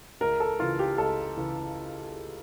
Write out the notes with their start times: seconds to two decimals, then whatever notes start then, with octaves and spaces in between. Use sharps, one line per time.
0.21 C#2 A#4
0.40 A4
0.59 C#3 E3 F4
0.79 G4
0.98 C#2 A4
1.37 C#3 E3